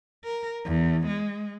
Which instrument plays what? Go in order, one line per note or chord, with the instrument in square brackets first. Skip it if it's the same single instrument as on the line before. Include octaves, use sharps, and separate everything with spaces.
[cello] A#4
E2
G#3